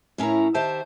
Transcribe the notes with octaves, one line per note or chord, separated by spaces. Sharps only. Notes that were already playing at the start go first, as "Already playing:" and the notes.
A2 C#4 E4 A#4 A#5
D#3 G4 C5 E5 A5